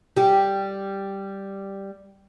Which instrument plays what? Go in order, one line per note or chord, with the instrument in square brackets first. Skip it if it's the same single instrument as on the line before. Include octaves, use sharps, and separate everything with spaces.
[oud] G3 G4